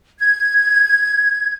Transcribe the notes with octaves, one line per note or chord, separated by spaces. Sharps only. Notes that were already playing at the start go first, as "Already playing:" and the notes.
G#6